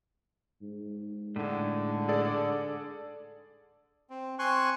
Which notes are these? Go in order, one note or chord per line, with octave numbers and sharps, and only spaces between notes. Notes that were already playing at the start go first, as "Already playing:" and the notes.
G#2
A2 D3 G#3
G#4 A4 D5
C4
C4 G#5 C6 C#6 F#6